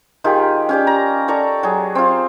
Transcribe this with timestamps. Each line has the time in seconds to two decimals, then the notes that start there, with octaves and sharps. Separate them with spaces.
0.24 D#3 F4 G4 G#4
0.69 C#4 G4 D5
0.87 A#5
1.28 A4 D5 A#5 C#6
1.63 F#3 G#4
1.95 C4 F4